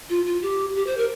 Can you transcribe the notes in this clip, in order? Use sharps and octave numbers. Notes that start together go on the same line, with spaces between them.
F4
F4
G4
G4
C5
A#4